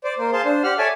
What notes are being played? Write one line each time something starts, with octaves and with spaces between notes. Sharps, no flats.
C5 D5
A#3 C5
G#4 C5 F5 A5 C6
D4 C5
G4 F#5 F6
A4 C#5 D5 E5 G#5 A5